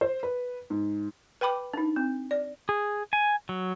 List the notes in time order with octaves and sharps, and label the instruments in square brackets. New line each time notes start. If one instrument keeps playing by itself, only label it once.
[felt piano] C5
B4
G#2
[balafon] B4 G5 B5 D6
D4 D#4
C4
D5
[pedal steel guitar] G#4
G#5
F#3